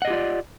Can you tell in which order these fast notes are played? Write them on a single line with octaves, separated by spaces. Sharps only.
F#5 D#5 G4 F4 D5